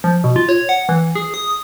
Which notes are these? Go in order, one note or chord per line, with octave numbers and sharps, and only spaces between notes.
F3
B2
F4
C#5
F#5
E3
G#4
D#6